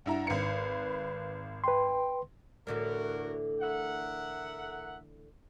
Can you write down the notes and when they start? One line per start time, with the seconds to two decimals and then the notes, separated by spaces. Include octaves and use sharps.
0.06 G2 E4 F#5 A#5
0.27 G#1 B4 C#7
1.64 B4 G5 C6
2.67 A2 D3 E3 F#4 A#4
3.61 A#4 E5 F#5